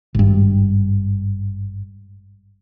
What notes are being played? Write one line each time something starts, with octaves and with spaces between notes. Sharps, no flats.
G#1 G2